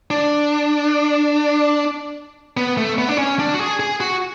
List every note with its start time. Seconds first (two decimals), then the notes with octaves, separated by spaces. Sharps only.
0.11 D4
2.57 B3
2.77 A3
2.98 B3
3.09 D4
3.18 C#4
3.39 D4
3.54 F#4
3.59 G#4
3.80 G#4
4.01 F#4